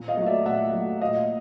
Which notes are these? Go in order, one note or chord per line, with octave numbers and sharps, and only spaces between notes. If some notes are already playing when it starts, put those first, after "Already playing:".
Already playing: A#2
D#5 F5
F#3
A3 D5 E5
A#2 E5 F#5
F#3 A3
A#2 D#5 F5